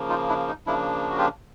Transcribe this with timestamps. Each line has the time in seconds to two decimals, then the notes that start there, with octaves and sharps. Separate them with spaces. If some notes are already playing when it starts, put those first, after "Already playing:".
Already playing: C#3 F3 A#3
0.09 D#4 F4
0.28 D4 E4
0.48 D#4
0.67 C#3 F3 A#3 D4 E4
1.10 F#4
1.18 F4 G4